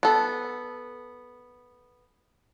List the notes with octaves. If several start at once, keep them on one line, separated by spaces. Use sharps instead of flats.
B3 A4